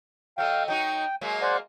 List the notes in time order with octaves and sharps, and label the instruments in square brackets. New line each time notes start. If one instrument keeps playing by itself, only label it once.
[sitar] F#3 A4 D#5 [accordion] F5 G5
[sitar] F#3 D#4 F#4 [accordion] G5
[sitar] F#3 G#3 A#3
[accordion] C5 D5 F#5